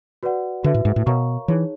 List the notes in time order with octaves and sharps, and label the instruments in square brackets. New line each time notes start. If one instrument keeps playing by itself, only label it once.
[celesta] F#4 B4 D5 F#5
[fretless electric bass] D3 [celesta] F#4 B4 E5
[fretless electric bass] A2
G#2
A2
[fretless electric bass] B2 [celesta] A#4 C#5 F5 A#5 C#6
[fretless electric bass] E3 [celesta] D#4 G#4 C#5